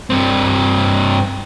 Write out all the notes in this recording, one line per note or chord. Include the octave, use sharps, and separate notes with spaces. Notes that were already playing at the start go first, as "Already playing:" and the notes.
G2 C4